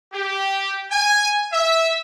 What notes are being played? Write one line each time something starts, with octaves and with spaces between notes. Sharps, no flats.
G4
G#5
E5